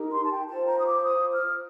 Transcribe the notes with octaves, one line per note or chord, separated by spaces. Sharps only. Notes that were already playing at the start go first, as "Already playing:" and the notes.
Already playing: D#4 G4 A#4
C6
A5
G5
F4 C5 A5
A#5
D#6
D6
D#6
F6